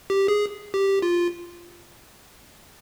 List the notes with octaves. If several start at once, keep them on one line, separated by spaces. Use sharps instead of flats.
G4
G#4
G4
F4